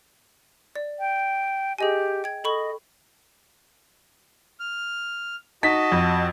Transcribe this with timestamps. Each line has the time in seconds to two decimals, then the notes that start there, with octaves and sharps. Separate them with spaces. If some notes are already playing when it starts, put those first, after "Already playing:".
0.76 D5
0.99 G5
1.78 G4 G#4 D#5 G#5
2.24 G5 G#6
2.44 A4 D#5 B5 C#6
4.60 F6
5.63 D#4 F#4 D#5 A5 B6
5.92 F2